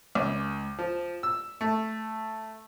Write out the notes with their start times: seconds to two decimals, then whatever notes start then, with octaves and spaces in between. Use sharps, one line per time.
0.15 C#2
0.79 F3
1.23 E6
1.61 A3